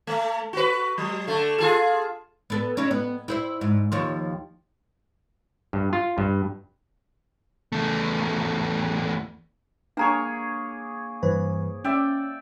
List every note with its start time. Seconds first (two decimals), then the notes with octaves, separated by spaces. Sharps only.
0.07 A3
0.53 F#4 B4
0.98 F#3
1.28 D3 A3
1.58 F4 G#4 A4
2.50 B3 A4 B4
2.77 C#4 D#4 E4
2.91 B3
3.28 E4 C5 E5
3.61 G#2
3.92 D#2 F3 C#5
5.73 G2
5.93 F4
6.18 G2
7.72 E2 A3
9.97 A#3 D4 G#4 C#5 A#5 C#6
11.23 G2 E3 B4 C5
11.84 C#4 D5 E5 G5